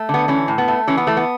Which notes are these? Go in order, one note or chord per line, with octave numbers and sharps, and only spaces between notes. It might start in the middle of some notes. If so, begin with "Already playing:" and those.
Already playing: A3
D3 B3
E3 C#4
A2
B3
A3
E3 C#4
B3
E3 A3
B3